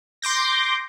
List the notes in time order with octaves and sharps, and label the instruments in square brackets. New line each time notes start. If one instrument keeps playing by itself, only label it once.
[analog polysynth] C6 D6 G6 A#6